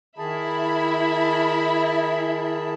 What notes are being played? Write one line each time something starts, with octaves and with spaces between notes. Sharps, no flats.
D#3 E4 G#4 E5 A5 B5